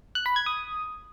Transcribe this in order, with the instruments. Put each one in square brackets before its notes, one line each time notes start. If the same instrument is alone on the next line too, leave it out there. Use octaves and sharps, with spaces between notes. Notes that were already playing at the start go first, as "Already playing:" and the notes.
[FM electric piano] F#6
B5
G#6
D#6